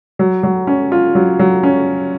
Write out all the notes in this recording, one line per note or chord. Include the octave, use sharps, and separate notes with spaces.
F#3
F#3
C#4
F4
F#3
F#3
C#4